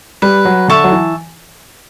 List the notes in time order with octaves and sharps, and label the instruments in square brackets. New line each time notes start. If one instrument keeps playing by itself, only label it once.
[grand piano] G3 [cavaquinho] B4
[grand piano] F#3
[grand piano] D3 [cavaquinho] E5 A5 C#6
[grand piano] F#3
E3